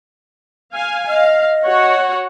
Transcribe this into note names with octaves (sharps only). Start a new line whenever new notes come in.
F5 G#5
D#5 F5
F#4 C#5 F#5